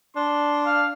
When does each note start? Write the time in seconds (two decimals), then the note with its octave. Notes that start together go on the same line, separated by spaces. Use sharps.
0.16 D4 C6
0.66 F5